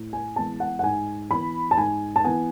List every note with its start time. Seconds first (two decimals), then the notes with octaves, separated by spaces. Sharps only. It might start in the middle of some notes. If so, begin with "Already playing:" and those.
Already playing: A2
0.13 G#5
0.36 E3 G#3 B3 A5
0.60 F#5
0.79 F#5
0.83 G#2 G#5
1.30 E3 B3 B5
1.71 A5
1.78 G#2 G#5
2.16 A5
2.24 E3 B3 G#5